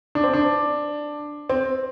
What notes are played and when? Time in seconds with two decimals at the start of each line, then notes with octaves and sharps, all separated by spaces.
0.15 D4
0.24 C4
0.33 D4
1.49 C4